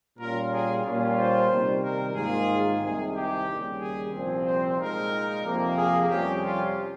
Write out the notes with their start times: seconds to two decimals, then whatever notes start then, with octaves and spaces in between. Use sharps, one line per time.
0.18 A#2 G3 C#4 F4 A#4
0.51 G#4
0.84 A#2 G3 A#3 C#4 F4
1.16 C5
1.49 C3 D#3 G3
1.82 A#4
2.14 G#2 D#3 A#3 F4 G#4
2.80 C2 C3 D#3 G#4
3.14 G4
3.46 D#2 C#3 G3
3.79 G#4
4.12 C2 A#2 F3 C4
4.44 C5
4.77 A#2 G#3 D#4 A#4
5.43 F2 C3 F3 A#3 F4
5.76 G#4
6.08 F2 C3 G3 C#4 G4
6.42 F4